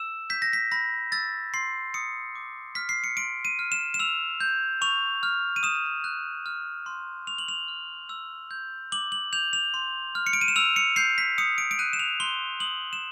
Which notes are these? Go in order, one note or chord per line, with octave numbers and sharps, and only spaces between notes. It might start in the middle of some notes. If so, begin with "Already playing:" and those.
Already playing: E6 E7
G6 B6
A#6
B6
B5 A#6
E6 A6
C6 C7
D#6 C#7
D6
F6 B6
C7
C#7
C6 D7
D#7
F6
E7
E7
E6 F7
G6
C#6 F7
F6
D#7
D#6 E7
F#6
F6
C6
C#6 F7
F#7
F7
F6
E6
G6
D6 F#7
F#7
G6 F7
F7
C6
F6
C#7
D7
D#7
E7
E6 F7
C#7
G6 C7
B6
D#6 C#7
D7
D7
F#6 D#7
E7
F7
C6 G7
D#6 F#7
E7